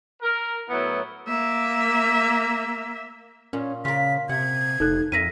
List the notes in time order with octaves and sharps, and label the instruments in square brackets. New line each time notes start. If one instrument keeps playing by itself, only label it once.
[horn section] A#4
A2 F#3 B3 E4
[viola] A#3 E5
[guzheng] A#2 [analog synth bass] C#4
[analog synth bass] C#3 [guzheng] F4 A#4 [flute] B6
[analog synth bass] C3 [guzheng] F#5 [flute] G#6
[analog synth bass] F1 [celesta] D#4 A4 F#6
[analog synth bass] F2 [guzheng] A#4 E5 [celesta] A#6 B6 D#7